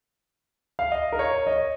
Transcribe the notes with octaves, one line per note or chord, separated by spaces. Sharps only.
F5
D#5
A#4
C#5
D#5